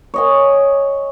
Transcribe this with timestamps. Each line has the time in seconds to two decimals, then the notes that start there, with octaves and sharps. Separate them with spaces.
0.14 C#5 D#5 G#5